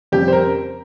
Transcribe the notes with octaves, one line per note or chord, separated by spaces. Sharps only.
F2 C#3 G3 G4
C5
A#4